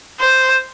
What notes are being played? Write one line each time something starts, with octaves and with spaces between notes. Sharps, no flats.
C5